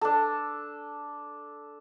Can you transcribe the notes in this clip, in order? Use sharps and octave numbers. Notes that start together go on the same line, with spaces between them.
D4 A4